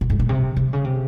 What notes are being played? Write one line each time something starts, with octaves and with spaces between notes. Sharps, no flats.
A#2
G#2
A#2
C3
C3
C#3
C3